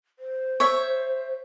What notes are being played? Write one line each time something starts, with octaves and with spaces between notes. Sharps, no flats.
C5
C#5 E5